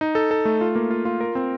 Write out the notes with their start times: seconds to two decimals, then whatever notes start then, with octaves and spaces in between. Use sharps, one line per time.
0.01 D#4
0.15 A4
0.31 A4
0.45 A3
0.61 F4
0.75 A#3
0.91 F4
1.05 F4
1.21 A#4
1.35 C4